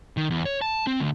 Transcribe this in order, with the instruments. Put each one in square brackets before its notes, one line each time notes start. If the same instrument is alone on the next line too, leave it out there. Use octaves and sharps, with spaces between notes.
[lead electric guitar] D#3
E2
C#5
A5
C4
D2